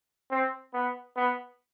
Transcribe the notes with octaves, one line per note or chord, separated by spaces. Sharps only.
C4
B3
B3